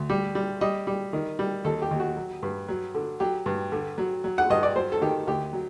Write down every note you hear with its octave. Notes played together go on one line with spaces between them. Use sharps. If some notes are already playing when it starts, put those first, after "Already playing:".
Already playing: D2
G3
G3
G3 D#5
G3
D#3
G3
D#2 A4
G4
D#2
F#4
F#3
G2
F#3
D3
F#3 G4
G2
D3
F#3
F#3
F#5
G2 D#5
D5
F#3 C5
A4
D#3 G4
D2 G4
F#3